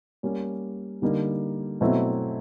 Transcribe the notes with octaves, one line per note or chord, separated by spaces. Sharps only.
G3 A#3 C#4
D3 G3 A#3 D#4
B2 F#3 A3 C4 E4